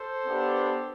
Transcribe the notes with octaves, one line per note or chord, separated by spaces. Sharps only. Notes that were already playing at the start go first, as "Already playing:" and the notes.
Already playing: A4 C5
B3 D4 G4